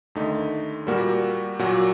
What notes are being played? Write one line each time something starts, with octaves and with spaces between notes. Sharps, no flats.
D#2 D3 A3 D#4
A#2 G3 A#3 F#4 A#4
A#2 F#3 A#3 F#4